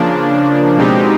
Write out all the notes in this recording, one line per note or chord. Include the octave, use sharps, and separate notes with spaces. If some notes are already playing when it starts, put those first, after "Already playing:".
Already playing: C#3 F3 A#3 D4
B2 G#3 C4 D#4 G4